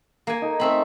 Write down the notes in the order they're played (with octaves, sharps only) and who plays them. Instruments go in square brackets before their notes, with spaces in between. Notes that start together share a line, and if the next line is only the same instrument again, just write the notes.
[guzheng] A#3 G#5
[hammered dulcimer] D#4 A4
[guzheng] A3 C4 B5 [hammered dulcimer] C#4